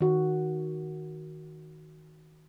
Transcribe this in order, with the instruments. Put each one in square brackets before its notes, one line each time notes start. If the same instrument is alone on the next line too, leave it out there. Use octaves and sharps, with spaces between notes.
[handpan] D#3 F#4